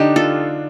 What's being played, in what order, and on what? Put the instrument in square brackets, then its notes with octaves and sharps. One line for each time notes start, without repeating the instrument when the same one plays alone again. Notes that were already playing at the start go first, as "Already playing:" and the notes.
Already playing: [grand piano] D3 D4 [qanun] D#4 G4
[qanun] F4 A4